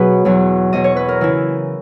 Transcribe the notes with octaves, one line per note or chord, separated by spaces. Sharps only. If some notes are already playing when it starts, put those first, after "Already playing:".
Already playing: B2 F#3 F#4 G#4 B4
E2 B2 F#3
E2 B2 F#3 D#5
C#5
B4
A#4
C#3 E3 E4